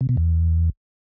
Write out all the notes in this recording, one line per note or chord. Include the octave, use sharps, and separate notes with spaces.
C3
B2
E2